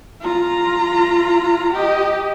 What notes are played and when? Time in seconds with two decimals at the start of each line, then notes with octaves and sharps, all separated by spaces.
0.21 F4 A#5
1.73 G4 D#5